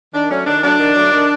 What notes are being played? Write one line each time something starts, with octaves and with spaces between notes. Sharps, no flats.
D#3 D4
F#3 A3 C#4
D#3 D4
F#3 A3 D4
D#3
F#3 A3
D#3